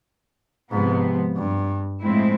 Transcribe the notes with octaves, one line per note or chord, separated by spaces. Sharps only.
G#2 C3 F3 G#3 B3
G2
A2 F3 G#3 C4 E4